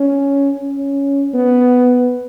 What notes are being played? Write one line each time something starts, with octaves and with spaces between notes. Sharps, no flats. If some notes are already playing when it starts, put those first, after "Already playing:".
Already playing: C#4
C#4
B3